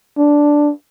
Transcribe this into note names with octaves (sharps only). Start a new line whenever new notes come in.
D4